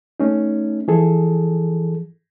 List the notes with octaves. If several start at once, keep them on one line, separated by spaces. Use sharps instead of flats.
A3 C#4 D#4
E3 F3 G#4 A4